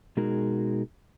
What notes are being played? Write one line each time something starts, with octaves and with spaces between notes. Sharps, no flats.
B2 G#3 D#4 F#4 G#4 A#4